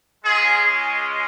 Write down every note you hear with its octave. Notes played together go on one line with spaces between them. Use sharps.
G#3 C#4 F4 G#4
G#4